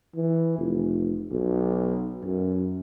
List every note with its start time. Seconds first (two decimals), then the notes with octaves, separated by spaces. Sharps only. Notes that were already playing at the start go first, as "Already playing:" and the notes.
0.16 E3
0.58 F1
1.31 B1
2.25 F#2